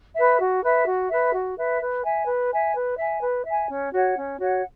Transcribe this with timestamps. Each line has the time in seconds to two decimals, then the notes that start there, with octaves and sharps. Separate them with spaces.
0.15 B4 E5
0.38 F#4
0.63 B4 E5
0.86 F#4
1.10 B4 E5
1.33 F#4
1.57 B4 E5
1.80 B4
2.04 E5 G#5
2.27 B4
2.51 E5 G#5
2.75 B4
2.98 E5 G#5
3.22 B4
3.45 E5 G#5
3.69 C#4
3.93 F#4 C#5 F#5
4.16 C#4
4.39 F#4 C#5 F#5